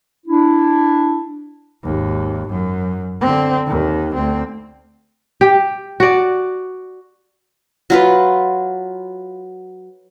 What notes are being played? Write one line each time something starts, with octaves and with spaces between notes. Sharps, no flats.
D4 E4
G#1 D#2
F#2
D3 C4
D#2 D#3
D2 C4
G4
F#4 D5
F#3 F4 B4